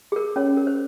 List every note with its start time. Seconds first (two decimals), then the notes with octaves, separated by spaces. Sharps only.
0.12 G#4
0.16 A#4
0.36 C#4 C#5
0.57 A#4
0.67 C5